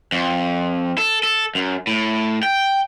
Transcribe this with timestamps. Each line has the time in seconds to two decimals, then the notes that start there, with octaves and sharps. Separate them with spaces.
0.12 F2
0.98 A4
1.23 A4
1.55 F#2
1.87 A2
2.43 G5